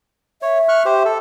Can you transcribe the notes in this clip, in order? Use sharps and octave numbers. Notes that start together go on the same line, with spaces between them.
C#5 E5
C#6 F6 F#6
G4 C5
A4